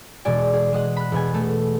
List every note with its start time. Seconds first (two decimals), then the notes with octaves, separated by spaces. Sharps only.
0.25 E1 B2 G#3 D5 G#5
0.53 G#4
0.73 G#3 D#5 F#5
0.96 B5 F#6
1.12 E1 B2 B3 G#5
1.34 A3